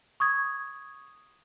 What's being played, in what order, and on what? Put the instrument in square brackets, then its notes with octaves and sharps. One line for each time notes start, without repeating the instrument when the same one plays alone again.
[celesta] C#6 D#6 G#6